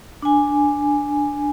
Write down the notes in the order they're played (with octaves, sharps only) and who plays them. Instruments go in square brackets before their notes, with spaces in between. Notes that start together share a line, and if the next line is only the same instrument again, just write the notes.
[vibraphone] D4 G#5